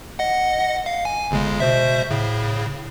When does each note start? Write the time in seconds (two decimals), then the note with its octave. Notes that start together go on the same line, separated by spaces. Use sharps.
0.19 D#5 F#5
0.86 F5
1.05 G#5
1.31 G1 C#3 G#3
1.60 B2 C5 E5
2.11 A2 C#3